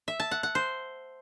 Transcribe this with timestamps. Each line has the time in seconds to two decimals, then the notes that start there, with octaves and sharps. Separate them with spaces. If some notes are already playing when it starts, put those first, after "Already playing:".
0.08 E5
0.20 A5
0.31 F#5
0.43 F#5
0.55 C5